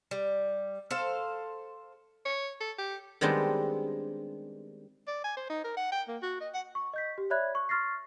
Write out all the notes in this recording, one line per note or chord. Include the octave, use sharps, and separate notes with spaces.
G3
A4 C5 F5
C#5
A4
G4
D#3 G3 G#3 B3 C4 D4
D5
G#5
C5
D#4
A#4
F#5
G5
A#3
F#4
D#5
F#5
C#6
D#5 G6 B6
G4
C#5 D5 E5 B5 F#6 G#6
C#6
C6 C#6 F6 A6 A#6 C7